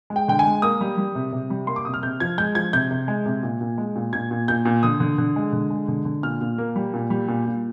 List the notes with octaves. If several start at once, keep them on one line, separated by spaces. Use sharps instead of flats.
G#3
G5
D3 G5
G#5
G#3
A#3 D#6
G3
G3
C3
C3
G3
A#3 C6
D6
C3 D#6
F6
C3 G6
F3 G#6
G#3 G6
F3 G#6
C3 G6
C3
G#3
C3
A#2
A#2
G#3
A#2
A#2 G#6
A#2
A#2 G6
A#2
D3 D#6
D3
D3
G#3
D3
G#3
D3
D3
A#2 F6
A#2
A#3
G3
A#2
G3
A#2
A#2